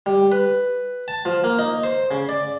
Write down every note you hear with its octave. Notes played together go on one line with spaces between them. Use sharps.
G3
B4
A5
F3
A#3
D#4
C5
C#3
D5